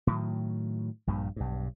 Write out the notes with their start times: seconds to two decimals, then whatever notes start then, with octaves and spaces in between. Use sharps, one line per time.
0.07 A2 D#3 F#3
1.07 A#1 G2 A#2
1.36 B1 G2